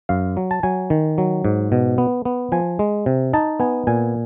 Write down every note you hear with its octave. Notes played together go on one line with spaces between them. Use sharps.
F#2 F5
F#3
A5
F#3 G#5
D#3
F#3
G#2
B2
B3
B3
F3 G#5
G#3
C3
D#4 A5
B3 G#5
A#2 G#5